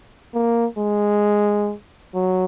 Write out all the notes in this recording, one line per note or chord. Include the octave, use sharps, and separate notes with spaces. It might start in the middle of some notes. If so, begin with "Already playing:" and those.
A#3
G#3
F#3